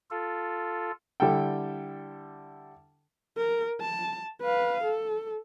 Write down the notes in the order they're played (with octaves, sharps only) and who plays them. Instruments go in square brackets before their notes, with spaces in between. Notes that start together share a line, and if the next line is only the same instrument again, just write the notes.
[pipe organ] F4 A4
[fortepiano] D3 G3 E4 A4 G5
[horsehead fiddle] A#4
A5
B4 F5
A4